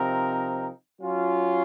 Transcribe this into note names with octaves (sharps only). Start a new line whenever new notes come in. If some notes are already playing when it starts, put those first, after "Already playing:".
Already playing: C3 F3 C4 D#4 A#4
F#3 C#4 F4